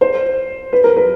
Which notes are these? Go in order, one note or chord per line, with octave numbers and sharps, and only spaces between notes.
C5
B4
A#4
B4